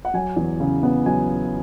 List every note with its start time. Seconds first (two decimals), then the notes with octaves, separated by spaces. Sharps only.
0.05 F#5
0.14 F#3 G#5
0.36 E2
0.60 C#3
0.83 B3
1.06 F#3 G#5